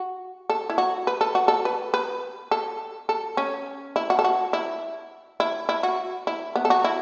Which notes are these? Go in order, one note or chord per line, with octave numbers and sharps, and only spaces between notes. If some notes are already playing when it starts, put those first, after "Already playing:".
Already playing: F#4
A4
E4
F#4
B4
A4
F#4
A4
B4
B4
A4
A4
C#4
E4
F#4
A4
F#4
E4
E4
E4
F#4
E4
B3
A4
F#4
E4